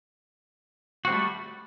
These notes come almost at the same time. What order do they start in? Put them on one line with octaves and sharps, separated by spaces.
F#4 C4 G3 A3